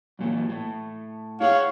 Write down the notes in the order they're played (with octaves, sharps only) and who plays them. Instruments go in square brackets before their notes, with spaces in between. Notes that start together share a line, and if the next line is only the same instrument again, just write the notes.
[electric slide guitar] F#2 A#2 E3
A2
[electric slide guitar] E4 G#4 F#5 [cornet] C#5 [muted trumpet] F5